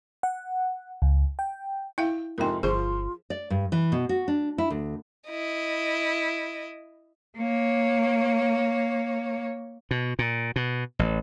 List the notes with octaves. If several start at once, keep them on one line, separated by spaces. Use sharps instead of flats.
F#5
C#2
G5
E4 E5 F5 G5
F2 G#2 C3 F4 A#4 G5
G1 F3 F4 G#4 C5 C#6
D5
G2
E3
B2
F#4
D4
E4
D2
E4 D#5
A#3 C#5
B2
A#2
B2
A1